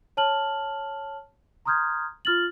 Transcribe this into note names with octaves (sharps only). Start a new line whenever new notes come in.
C#5 A5 F6 F#7
A#5 C6 D#6 F6 G6 G#6
F4 F6 A6 F#7